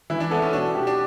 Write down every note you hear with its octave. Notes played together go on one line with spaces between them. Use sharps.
E3 E4
D4
B3 A4
C#4
B2 D4
G4
D4